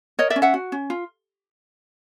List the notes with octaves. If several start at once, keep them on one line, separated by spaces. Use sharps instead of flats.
A#4 C#5 D#5
D5 E5
C#4
E5 F#5
F#4
C#4
F4